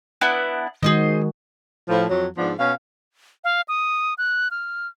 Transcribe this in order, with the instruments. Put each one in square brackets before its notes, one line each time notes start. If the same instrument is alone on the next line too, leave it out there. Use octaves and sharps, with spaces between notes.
[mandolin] B3 D4 E4
[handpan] D#3 G#3 F#4 [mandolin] G#4 C5 D#5
[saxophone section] A2 F3
F2 F#3
G#2 F3 B3 D4
B2 C#4 F5
[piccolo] F5
D#6
F#6
F6